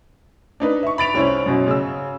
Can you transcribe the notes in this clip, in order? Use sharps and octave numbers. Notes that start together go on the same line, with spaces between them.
D4 D#4 B4
E5 C#6
B5 A6 D7 F7
C2 C#4 E4 C5
F#2 B2
C#3 E6